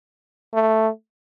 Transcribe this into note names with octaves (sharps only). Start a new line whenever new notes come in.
A3